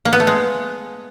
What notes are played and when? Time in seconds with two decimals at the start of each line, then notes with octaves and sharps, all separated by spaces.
0.05 A#3
0.13 B3
0.20 A3
0.27 G#3